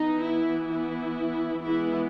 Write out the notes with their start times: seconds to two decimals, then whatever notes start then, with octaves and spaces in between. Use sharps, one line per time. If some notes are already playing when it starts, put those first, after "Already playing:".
Already playing: E3 B3 D#4
0.26 E4
0.72 E4
1.65 E3 G#3 B3 E4